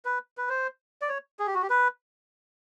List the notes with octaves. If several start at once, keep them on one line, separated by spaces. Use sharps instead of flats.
B4
B4
C5
D5
C#5
G#4
G4
F#4
G4
B4